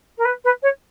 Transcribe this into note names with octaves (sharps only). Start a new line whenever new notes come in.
A#4
B4
B4
C#5